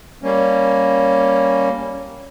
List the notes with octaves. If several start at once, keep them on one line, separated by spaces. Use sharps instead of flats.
G3 A#3 C#4